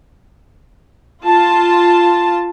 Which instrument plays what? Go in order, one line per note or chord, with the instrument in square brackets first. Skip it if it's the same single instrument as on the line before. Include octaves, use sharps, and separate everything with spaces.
[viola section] F4 A5